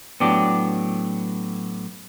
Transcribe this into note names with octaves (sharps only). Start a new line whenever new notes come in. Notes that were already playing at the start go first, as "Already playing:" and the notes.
A2 F#3 B3 D4 G4